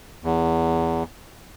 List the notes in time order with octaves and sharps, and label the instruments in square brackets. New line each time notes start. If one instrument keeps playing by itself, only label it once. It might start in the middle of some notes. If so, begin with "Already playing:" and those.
[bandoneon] E2